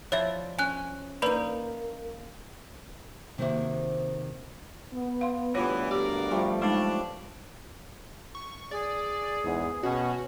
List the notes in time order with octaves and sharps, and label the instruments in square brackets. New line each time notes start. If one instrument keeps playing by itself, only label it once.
[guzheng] F3 E4 D5 [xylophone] C#5 E5
[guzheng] C#4 [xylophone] G#5 F#6
[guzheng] A#3 D#4 [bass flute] A#4 [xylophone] B4 D5 B5
[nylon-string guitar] C3 D#3 A#3 F#4 C5 E5
[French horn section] B3
[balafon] F5 C6
[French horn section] D2 G2 [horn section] E3 [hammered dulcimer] B3 F#5 [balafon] F4 C#5
[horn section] A#3 A#4 D5 [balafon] G4
[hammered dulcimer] F3 G3 A3
[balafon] G#3 D#4 [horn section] D4 [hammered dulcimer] C#5
[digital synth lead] C#6
[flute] G#4 [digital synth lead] D5
[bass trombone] E2 [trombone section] G#2
[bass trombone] B2 [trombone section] C#4 [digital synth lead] F#4